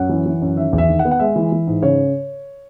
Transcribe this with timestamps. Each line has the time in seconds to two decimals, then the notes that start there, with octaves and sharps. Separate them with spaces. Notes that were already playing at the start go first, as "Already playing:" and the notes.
Already playing: F#2 F#5
0.09 E3
0.26 E3
0.42 F#2
0.57 D#3 E5
0.73 E2
0.78 E5
0.89 D#3
0.99 F#5
1.05 B3
1.11 F#5
1.20 G#3 E5
1.36 E3
1.52 E3
1.67 G#2
1.83 C#3 C#5